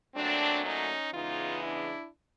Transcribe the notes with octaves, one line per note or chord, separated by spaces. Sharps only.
A#2 F#3 A3 C4 D4
C#4 D#4
E2 C#3 E3 G#3 B3 D#4 F4
D4 E4